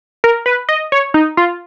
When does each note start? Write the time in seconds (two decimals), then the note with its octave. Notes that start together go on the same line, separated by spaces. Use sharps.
0.24 A#4
0.46 B4
0.69 D#5
0.92 C#5
1.14 D#4
1.37 F4